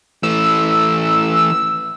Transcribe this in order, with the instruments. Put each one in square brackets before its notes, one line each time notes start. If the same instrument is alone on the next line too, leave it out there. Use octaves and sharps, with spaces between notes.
[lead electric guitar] E3 A3 [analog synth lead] E6